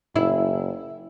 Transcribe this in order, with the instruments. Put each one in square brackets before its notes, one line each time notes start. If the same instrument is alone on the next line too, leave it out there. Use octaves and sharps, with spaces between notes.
[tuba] F#1 [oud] E4